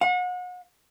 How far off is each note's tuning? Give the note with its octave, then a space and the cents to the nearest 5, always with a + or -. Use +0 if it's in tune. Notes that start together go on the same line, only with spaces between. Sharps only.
F#5 -35